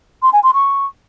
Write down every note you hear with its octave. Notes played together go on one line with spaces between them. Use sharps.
C6
G#5
C6
C#6